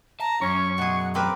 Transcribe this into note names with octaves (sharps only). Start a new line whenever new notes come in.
A5 A#5
F#2 C#4 C#6
B2 G#4 F#5
C4 A#4 B4 D6